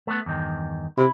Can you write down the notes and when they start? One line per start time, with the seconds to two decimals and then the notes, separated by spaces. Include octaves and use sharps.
0.07 A3 B3
0.26 E2 G2 D#3
0.98 C3 E4